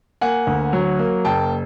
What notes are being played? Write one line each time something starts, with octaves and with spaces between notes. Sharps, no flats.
A#3 F#5 G#5
D2
F#3
A#3
F#1 G5 A5